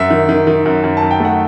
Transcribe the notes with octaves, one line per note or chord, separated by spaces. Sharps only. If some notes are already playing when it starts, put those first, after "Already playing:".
Already playing: F#2 E5
D#3
D#3
D#3
F#2
F#2
A5
F#2
G5
A3 F#5